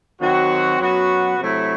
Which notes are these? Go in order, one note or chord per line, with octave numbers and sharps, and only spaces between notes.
D#3 F#3 C4 F#4
F#2 F#3 B3 F#4
C3 F#3 A3 E4